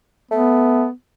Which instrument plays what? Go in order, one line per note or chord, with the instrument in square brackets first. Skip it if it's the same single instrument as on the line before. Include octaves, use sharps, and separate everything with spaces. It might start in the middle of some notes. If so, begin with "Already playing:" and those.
[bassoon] A3 [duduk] B3